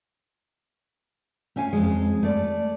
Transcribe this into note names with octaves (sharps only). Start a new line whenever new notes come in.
A3 C#4 F5 G#5
F2 G#3
A3 D5